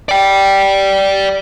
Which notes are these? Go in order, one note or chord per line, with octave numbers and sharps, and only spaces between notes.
D5 G5